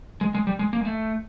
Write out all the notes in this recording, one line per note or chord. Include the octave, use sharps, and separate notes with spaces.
G#3
G#3
G3
G#3
A#3
G#3
A3